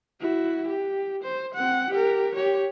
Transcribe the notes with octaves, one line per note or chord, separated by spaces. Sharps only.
E4 F#4
G4
C5
C4 F#5
G4 A#4
G4 C#5